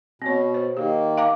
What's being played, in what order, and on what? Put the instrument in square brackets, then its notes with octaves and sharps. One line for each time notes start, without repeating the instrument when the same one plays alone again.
[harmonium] B2 [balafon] C4 C#5
[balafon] C5
[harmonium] D#3 A#3 [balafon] G4
[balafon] F5 A#5 D6